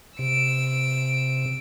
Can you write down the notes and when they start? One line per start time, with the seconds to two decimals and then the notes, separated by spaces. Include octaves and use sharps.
0.19 C3 E6 D7